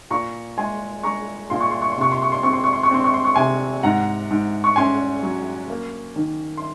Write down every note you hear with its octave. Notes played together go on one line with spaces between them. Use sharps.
A#2 A#5 C#6
G#3 G#5 C6
G#3 A#5 C#6
A#2 C6
C#6
C6
C#6
C6
C3 C#6
C6
C#6
C6
C4 C#6
C6
C#6
C6
C#6
C4 C6
C#6
C6
C#6
C3 G#5 C6
G#2 F#5 A#5
G#2
C#6
C#4 G#5 C6
F#3
A#3
D#3
C6